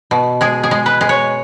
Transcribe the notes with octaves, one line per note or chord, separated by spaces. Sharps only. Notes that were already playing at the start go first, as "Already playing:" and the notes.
B2
G#3 G#4
G#4
G#3
B4
G#3
C#5